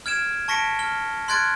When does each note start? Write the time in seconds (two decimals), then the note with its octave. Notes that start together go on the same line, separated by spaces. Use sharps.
0.06 F6 G#6 D7 E7
0.48 A5 C#6 A#6 B6 C#7 D7
0.79 F6 G7
1.28 C6 F6 F#6 G#6 A6 D7